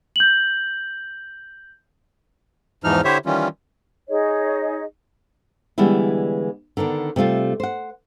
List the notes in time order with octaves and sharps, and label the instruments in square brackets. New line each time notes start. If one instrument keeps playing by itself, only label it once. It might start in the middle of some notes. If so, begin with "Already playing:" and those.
[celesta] G6 F#7
[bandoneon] E2 G#2 E3 F3 D#4 F6
D3 E4 G4 C5 C#5 E5
D#3 E3 G3 C#4 F4
[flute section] D#4 G#4 C#5 D#5
[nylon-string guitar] D3 E3 G3 G#3 B3 E4
D3 D#3 B3 D4
C3 G3 A3 F4
C5 F#5